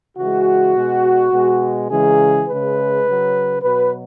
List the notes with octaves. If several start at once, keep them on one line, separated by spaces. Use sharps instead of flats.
C#3 E3 G#3 F#4
B2 G#3
B2 G#3
C#3 E3 G#3 G#4
C#3 G#3 B4
C#3 F#3
B2 F#3 B4